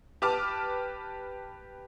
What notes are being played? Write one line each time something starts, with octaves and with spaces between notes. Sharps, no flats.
G4 B4 A5 D6 F6